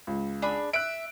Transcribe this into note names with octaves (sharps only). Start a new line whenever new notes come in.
C#2
D4 G#4 B5
E5 F#6 D7